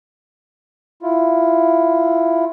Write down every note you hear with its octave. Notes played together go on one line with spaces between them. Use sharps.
E4 F4